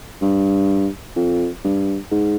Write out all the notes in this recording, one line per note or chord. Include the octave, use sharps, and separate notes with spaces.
G2
F2
G2
G#2